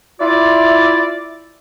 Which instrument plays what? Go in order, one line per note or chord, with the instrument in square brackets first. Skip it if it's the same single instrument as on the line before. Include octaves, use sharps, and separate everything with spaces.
[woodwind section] E4 F4 D5